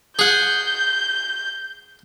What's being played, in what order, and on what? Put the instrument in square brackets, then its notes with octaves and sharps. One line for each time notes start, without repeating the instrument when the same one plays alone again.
[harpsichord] G#4 F#5 [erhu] G6